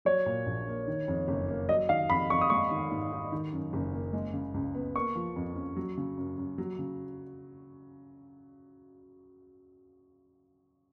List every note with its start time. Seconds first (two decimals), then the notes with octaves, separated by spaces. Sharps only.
0.05 F#3 C#5
0.26 A#2
0.46 A#1
0.67 A#3
0.87 D#3
1.08 F2
1.28 F#1
1.48 A#3
1.69 F#3 D#5
1.89 D#3 F5
2.10 F2 B5
2.30 F2 C#6
2.41 D#6
2.50 G#3 C#6
2.71 D#3
2.91 G#2
3.12 D#4
3.32 D#3
3.52 F#2
3.73 F#1
3.93 A#3
4.13 G#3
4.34 C#3
4.54 C#2
4.75 B3
4.95 A#3 C#6
5.15 F3
5.36 F2
5.56 C#4
5.76 F#3
5.97 C#3
6.18 F#2
6.38 F#2
6.58 F#3
6.79 C#3